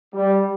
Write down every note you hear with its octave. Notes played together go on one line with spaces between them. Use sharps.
G3